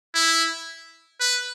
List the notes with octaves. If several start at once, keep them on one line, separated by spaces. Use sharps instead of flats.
E4
B4